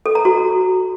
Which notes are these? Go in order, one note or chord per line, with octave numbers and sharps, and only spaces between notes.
A4
A#5
F#4